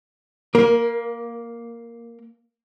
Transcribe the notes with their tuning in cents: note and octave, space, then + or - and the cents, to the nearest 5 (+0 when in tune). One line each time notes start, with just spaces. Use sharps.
A#3 +0 A#4 +30